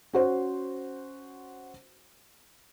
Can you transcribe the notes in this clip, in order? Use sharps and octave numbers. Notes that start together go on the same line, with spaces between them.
C#4 F#4 C5